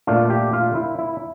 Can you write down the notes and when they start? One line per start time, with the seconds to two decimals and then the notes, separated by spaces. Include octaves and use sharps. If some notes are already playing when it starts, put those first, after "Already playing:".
0.07 A#2 A3 D4 F4
0.30 G4
0.53 F4
0.75 E4
0.99 E4